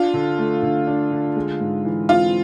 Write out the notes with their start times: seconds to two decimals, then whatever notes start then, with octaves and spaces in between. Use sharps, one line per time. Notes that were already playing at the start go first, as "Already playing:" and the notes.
Already playing: D4 F4
0.14 D3
0.38 A3
0.63 D3
0.87 D4
1.12 D3
1.36 G#3
1.60 G#2
1.85 E3
2.09 C4 F4